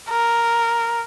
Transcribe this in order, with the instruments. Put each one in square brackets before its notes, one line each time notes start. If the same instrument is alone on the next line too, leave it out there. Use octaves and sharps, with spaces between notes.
[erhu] A#4